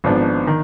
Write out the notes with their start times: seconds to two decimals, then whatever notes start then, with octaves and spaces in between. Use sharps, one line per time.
0.04 G#1 G#2 F3 B3 D4
0.47 D#3